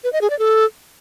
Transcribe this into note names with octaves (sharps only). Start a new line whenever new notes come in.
B4
D#5
G#4
D5
A4